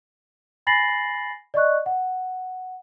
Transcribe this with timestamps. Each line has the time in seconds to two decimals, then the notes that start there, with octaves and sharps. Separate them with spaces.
0.67 G#5 B5 A6 A#6 C7 F#7
1.54 D5 D#5 C#6 F#6
1.86 F#5